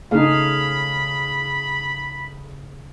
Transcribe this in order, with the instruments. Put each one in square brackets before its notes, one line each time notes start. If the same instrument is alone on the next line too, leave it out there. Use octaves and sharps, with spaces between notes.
[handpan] C#3 G#4 F5 [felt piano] A3 D#4 [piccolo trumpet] B5